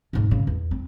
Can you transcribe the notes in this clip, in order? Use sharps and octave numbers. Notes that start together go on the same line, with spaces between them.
D2 G#2
C#3
E2
C4